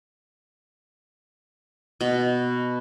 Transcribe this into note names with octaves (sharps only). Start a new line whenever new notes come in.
B2